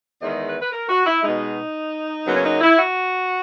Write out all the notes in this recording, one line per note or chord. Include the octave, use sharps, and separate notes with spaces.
E2 D#3 G#3 D#5
B4
B4
A#4
F#4
E4
B2 G#3 D#4
F#2 C#3 F#3 A#3 B3
C#4
D#4
E4
F#4